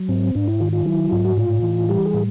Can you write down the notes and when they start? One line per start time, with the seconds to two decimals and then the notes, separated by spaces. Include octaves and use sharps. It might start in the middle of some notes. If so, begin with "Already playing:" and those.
Already playing: F#3
0.09 G#2 C4
0.35 G#2 D4
0.48 E4
0.60 D#3 F4
0.73 F4
0.85 F#3 E4
1.11 G#2 F4
1.24 F#4
1.37 A2 F4
1.62 E3
1.89 G3 G4
2.06 G#4
2.14 A2